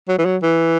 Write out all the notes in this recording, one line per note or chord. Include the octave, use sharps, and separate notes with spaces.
F#3
E3
F#3
E3